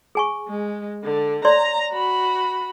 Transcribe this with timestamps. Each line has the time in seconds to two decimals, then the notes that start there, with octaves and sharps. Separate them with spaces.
0.15 G#4 G#5 C#6
0.48 G#3
1.04 D3
1.45 C#5 D5 A#5 C6
1.92 F#4 B5